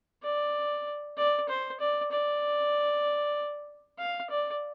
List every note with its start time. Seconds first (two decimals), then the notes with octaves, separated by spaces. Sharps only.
0.23 D5
1.17 D5
1.49 C5
1.80 D5
2.11 D5
3.98 F5
4.30 D5